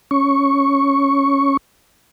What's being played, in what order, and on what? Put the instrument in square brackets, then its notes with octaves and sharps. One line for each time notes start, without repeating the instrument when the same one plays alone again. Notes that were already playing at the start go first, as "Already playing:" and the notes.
[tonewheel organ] C#4 C#6